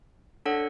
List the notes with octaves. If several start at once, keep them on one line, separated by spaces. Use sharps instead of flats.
D4 A4 C#5 F#5